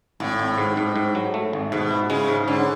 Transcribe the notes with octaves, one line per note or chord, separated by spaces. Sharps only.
G#1 A2
G#1
G#2
G#2
G#2
F#3
A3
G#1
G#2 B2
E4
C#3 G#3
G#2
D3 C#4